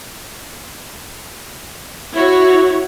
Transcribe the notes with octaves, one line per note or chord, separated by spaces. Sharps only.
E4 F#4 C#5